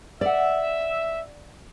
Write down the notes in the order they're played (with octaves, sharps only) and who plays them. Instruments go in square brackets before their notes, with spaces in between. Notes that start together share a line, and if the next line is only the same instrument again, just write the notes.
[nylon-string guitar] D5 F#5 [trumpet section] E5